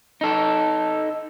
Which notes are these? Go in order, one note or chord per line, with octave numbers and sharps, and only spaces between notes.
D#4 A4